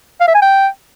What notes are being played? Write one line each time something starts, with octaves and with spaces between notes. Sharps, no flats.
F5
E5
G#5
G5